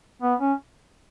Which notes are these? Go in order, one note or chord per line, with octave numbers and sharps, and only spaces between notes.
B3
C#4